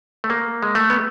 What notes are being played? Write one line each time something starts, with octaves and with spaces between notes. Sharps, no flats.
A3
A#3
G#3
A3
B3